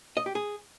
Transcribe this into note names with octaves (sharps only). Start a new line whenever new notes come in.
D#5
G4
G#4